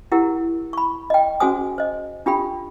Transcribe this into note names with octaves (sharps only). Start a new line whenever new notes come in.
E4 G4 A#4 F#5
B5 C#6
D#5 G5
C#4 F#4 G#4 C5 G#5 D#6
C5 D#5
D4 F4 G4 A4 G5 B5